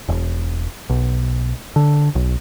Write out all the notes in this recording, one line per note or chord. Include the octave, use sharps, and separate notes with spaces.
E1
B1
D3
B1